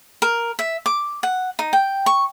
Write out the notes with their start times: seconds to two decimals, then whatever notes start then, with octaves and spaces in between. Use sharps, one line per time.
0.22 A#4
0.59 E5
0.86 D6
1.23 F#5
1.59 D#4
1.73 G5
2.06 C#6